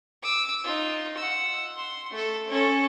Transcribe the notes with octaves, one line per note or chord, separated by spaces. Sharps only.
D6 E6
D#4 F4
F#5 E6
C6
A3 A4
C#4 A4